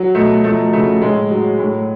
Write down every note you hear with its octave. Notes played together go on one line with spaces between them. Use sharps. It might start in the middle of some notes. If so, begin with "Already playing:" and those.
Already playing: F#3
B2 A3
F3 A3
C#3 A3
A2 G#3
F#3
A2